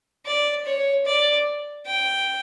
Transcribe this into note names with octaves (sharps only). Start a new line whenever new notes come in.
D5
C#5
D5
G5